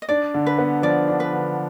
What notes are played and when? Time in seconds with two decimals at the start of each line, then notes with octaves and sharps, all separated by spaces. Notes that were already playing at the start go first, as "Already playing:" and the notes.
0.02 D#5
0.09 D4 D5
0.34 D3
0.46 B4
0.58 B3
0.83 F3 D5
1.08 D4
1.20 B4
1.33 D3